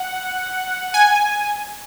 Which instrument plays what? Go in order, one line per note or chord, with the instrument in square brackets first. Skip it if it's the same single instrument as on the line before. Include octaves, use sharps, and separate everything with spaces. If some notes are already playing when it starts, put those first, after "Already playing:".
Already playing: [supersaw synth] F#5
G#5